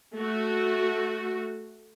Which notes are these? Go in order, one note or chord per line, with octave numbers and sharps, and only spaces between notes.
A3 F#4